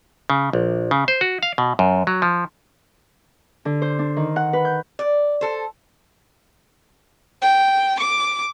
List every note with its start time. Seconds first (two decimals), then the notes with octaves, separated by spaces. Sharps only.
0.30 C#3
0.53 A#1
0.91 C#3
1.08 C5
1.21 F#4
1.43 F5
1.58 B2
1.79 F#2
2.07 F#3
2.22 F3
3.65 D3
3.82 C5
3.99 D4
4.17 D#3
4.36 F#5
4.53 B4
4.65 G6
4.99 D5
5.41 A4 C5
7.42 G5
8.00 D6